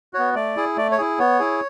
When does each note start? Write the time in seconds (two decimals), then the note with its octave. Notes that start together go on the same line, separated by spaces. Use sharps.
0.14 B3 F#4 C#5
0.34 A3 D5
0.56 E4 G#4
0.77 A3 D5
0.92 C#5
0.98 E4 G#4
1.19 B3 C#5
1.39 E4 G#4